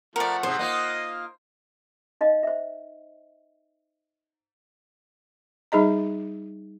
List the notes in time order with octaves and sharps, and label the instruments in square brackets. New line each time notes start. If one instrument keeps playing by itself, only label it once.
[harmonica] F3 A3 [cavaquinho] A#4 D5 [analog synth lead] F#5
[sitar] G#2 C3 [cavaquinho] C5
[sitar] A#3 D#4 F4 [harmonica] D#5
[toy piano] D#4 D#5 F5
C5 E5
[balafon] G3 D#4 G#4 D#5 A#5